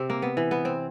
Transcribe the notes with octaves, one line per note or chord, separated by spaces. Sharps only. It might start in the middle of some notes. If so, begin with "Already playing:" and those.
Already playing: C3 C4
A#3
B3
E3
B3
C4